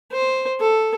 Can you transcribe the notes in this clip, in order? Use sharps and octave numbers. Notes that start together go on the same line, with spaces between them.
C5
A4